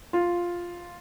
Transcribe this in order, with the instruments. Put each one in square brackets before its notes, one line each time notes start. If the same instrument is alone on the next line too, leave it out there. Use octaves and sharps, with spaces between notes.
[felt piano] F4